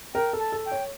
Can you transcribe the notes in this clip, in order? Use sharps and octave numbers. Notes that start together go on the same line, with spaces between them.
A#4 G5
A4
A5
A4
G5
C#5